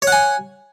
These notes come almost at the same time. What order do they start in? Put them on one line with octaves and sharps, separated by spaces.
C#5 F#5 G#5